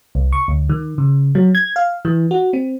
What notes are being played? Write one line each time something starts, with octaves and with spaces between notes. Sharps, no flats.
C2
C#6
D2
D#3
C#3
F#3
G#6
F5
E3
F#4
C4